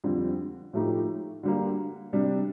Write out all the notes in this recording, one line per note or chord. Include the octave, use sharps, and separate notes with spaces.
F2 D3 G3 C4
A2 F3 A3 D#4 G4
D3 G3 A#3
C3 G3 D4